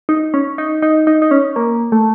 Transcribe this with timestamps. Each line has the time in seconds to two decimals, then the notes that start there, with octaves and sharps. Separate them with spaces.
0.09 D#4
0.34 C#4
0.58 D#4
0.82 D#4
1.07 D#4
1.22 D#4
1.31 C#4
1.56 A#3
1.92 A3